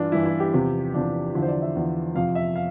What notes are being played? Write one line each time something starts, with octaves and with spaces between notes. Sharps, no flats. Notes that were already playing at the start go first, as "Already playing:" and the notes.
Already playing: G2 E3 D4 F4
G2 E3 E4
E4
G4
E2 C3 F3
E2 C3 F3 D4
E2 D3 F3 E4
C5
D5
E5
E2 D3 F3
F2 C3 F3 F5
E5
F5